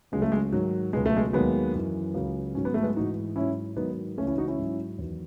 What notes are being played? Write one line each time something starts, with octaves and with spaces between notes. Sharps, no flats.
C#2 C#3 F#3 G#3
A3
G#3
G#2 D#3 F#3
C#2 B2 F#3 G#3
A3
G#3
D#2 D#3 F#3 G#3 B3
F#2 E3
C#2 C#3 F#3
G#2 D#3 F#3 C#4
B3
A3
G#3 B3
G#2 E3 D#4 F#4
G#2 F#3 C#4 E4
G#2 D#3 F#3 B3 D#4
C#2 C#3 E3 A3 C#4
C#4 E4
D#4 F#4
C#4 E4
G#2 F#3
E2 D#3 F#3